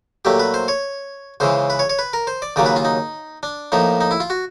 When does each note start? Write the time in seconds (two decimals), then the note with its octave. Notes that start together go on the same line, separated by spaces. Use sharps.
0.25 A#2 F#3 A3 G4
0.39 B4
0.54 C5
0.68 C#5
1.40 C#2 C#3 E3 C5
1.70 B4
1.79 C#5
1.89 C#5
1.99 B4
2.13 A#4
2.27 C5
2.42 D5
2.56 D#2 C#3 F#3 A#3 D5
2.66 B4
2.76 F4
2.85 D#4
3.43 D4
3.72 A2 F3 A#3 D#4
4.01 D#4
4.11 E4
4.20 F4
4.30 F#4